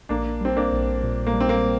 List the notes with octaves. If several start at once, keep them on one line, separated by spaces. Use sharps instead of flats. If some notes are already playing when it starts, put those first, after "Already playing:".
A#1 A#3 D4
G3 C4
A#3 D4
A#1
A#2
A#3
G3
C4
A#3